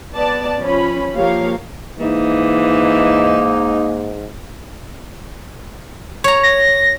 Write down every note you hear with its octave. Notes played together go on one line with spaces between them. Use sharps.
B3 D5 A5
F3 C#4 B5
F3 A#3 G4 A#4 C#5 F5
G#2 E3 A#3 D#4
C#5 A#5
A#6